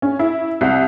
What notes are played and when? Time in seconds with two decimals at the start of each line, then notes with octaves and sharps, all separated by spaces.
0.02 C#4
0.19 E4
0.61 C2